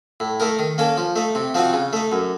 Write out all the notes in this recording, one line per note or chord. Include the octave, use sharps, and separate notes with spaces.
A2
A3 D#4 A#4
D#3
A#3 C#4 A4
F3
A3 D#4
C3
F3 C4 D#4 F#4
C#3
A3 D#4
F#2